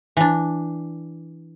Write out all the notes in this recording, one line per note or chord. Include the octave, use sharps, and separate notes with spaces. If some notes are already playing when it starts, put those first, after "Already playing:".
E3 D4